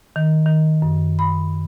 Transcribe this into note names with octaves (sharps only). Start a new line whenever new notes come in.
D#3
D#3
F#2
B5